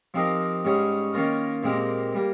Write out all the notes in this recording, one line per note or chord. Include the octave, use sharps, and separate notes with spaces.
F3 C4 D#4 G4 A#4
G#2 G3 C#4 G#4 C#5
D#3 A#3 C#4 F4 A#4
A#2 G#3 C4 G4 A#4
G3 A#3